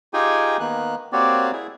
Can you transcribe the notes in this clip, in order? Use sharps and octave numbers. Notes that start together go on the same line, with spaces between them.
D#4 F4 G4 G#4 G5 G#5
D#3 A#3 B3 F#6
A#3 C4 F#4 G4 C#5 D5
E4 G#4